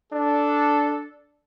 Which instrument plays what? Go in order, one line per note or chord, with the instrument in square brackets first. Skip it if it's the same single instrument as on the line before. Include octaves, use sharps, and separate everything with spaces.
[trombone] D4 [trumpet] A4